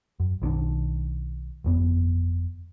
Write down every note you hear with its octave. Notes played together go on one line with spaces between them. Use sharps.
F#2
B1 D#3 C#4 D4
G1 F2 B3